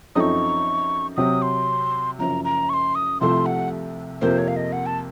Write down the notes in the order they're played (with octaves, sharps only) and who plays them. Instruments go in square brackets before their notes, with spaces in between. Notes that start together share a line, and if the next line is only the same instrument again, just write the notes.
[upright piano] F#2 F3 C4 D#4 A4 [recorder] C#6 D#6
[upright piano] C3 F#3 C4 [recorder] D#6
[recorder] C6
[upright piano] F#1 F#2 F3 [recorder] A#5
[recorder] A#5
C#6
C6
D#6
[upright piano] C2 C3 F3 A3 [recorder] C6
[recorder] F#5
[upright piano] F2 C3 F3 A#3 [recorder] C5
[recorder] C#5
F5
D#5
F#5
A5